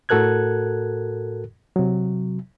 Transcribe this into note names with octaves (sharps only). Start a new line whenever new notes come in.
A2 F#4 A4 A#4 F#6 G#6
C3 F#3